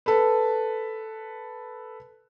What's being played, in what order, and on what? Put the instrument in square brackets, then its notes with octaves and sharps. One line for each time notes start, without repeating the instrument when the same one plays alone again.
[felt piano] A4 B4